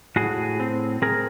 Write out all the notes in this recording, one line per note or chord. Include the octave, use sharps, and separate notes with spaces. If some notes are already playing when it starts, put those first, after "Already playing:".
A2 F#4 G#4
C4
C4 G#4 A#4